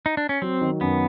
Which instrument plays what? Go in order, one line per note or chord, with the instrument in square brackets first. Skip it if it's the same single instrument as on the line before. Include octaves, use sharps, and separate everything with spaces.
[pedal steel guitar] D#4
D4
C#4
[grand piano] F#3 [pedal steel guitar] C4
[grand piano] D#3
[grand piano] F#2 [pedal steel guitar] B3